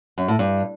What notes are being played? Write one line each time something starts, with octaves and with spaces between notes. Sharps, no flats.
F#2
A2
G2